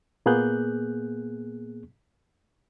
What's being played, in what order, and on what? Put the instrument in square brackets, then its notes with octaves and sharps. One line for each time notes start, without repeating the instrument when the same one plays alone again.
[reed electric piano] A#2 A#3 B3 G#4 F#6 G6